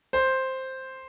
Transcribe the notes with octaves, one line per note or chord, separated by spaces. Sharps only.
C5